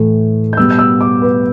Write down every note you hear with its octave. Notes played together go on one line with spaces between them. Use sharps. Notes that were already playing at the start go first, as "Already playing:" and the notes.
Already playing: A2 E3 A3
G6
B2 G3 B3 E6
G6
E6
D6
B4